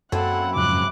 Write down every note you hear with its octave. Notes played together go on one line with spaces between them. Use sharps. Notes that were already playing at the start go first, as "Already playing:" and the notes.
F#2 A#3 C4 E4 A4 F#5 A5
F2 G#2 C#3 D6 F#6